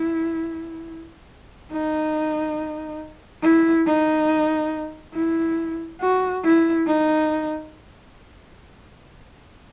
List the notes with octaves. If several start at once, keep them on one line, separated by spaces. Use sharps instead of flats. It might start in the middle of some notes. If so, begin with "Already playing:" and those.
Already playing: E4
D#4
E4
D#4
E4
F#4
E4
D#4